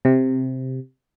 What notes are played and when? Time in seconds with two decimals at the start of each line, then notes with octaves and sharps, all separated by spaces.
0.05 C3